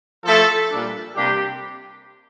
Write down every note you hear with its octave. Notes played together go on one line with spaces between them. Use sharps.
F3 A3 E4 A4
A#2 G3 D4
C3 G3 A#3 D4 G4